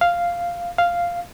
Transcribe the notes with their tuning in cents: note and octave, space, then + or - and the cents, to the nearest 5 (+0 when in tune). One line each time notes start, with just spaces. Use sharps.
F5 -5
F5 -5